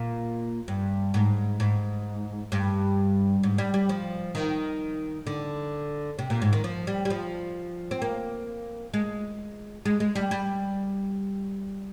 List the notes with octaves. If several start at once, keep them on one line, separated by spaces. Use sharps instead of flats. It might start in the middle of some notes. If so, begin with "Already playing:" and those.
Already playing: A#2
G2
G#2
G#2
G2
G#2
G3
G3
F3
D#3
D3
C3
A#2
G#2
D#3
F3
G3
G3
F3
C4
A#3
G#3
G#3
G#3
G3
G3